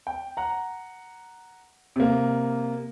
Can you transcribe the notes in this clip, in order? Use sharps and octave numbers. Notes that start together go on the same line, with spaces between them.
G5
F#5 A#5
C3 A#3